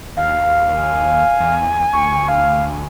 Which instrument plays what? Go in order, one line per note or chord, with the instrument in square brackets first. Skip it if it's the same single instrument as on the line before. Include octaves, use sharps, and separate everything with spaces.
[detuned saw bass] D#2 [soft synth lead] F5
[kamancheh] G#5
[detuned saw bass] E2
[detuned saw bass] D2 [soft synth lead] C#6
[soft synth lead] F5